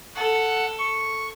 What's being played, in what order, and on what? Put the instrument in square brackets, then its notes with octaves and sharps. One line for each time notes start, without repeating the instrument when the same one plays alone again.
[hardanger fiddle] A4 [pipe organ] F#5
[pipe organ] C#6